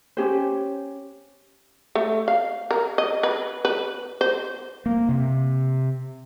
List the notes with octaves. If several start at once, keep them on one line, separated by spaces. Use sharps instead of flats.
C#4 G4 C5
A3
F5
A#4
D#5
B4
B4
C5
A#3
C3